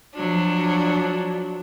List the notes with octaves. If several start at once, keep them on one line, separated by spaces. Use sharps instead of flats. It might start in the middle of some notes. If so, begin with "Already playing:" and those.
F3 F#3 D4